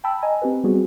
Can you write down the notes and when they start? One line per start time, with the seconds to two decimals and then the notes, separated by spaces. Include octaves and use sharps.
0.04 G5 A5 B5 E6
0.22 D#5 G#5 A#5
0.42 C4 G4 B4
0.64 G3 B3 C4 F#4 G#4